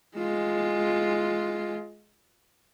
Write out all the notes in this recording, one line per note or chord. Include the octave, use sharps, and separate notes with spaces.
G#3 F4